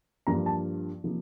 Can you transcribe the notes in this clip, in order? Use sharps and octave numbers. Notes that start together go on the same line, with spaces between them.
G2 F3 A#3 F4 A#5
A5
C3 F3 A#3 D#4